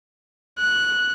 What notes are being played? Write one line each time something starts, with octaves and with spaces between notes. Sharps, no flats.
F#6